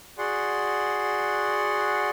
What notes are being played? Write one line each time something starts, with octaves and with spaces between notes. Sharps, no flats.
F#4 G#4 D5 F#5 C6